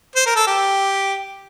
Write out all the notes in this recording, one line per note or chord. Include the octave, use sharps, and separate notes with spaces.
C5
A#4
A4
G4